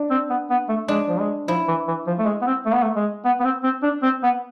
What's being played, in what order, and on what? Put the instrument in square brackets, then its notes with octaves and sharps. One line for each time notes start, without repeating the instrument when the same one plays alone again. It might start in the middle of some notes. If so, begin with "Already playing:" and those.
Already playing: [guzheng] D4
[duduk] C4
B3
B3
A3
[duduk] G#3 [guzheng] D4
[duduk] F3
G#3
[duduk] F3 [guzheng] E4
[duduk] E3
E3
F3
A3
G#3
B3
C4
A3
B3
A3
G#3
B3
B3
C4
C4
D4
C4
B3